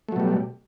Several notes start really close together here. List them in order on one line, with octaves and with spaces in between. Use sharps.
A3 F#3 B2 G3